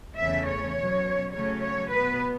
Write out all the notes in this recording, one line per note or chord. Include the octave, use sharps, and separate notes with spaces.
E2 C#3 A3 C#4 E5
C#5
B2 F#3 C#4
C#3 F#3 A3 C#4 C#5
C#5
B2 B3 B4